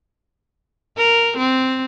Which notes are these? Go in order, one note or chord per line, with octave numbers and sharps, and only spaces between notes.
A#4
C4